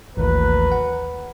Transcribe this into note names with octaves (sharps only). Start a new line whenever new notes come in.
A1 D#2 A2 F#3 A#4 B4
F#5